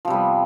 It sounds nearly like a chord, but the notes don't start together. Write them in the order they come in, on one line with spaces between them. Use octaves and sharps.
F3 C3 G3 B3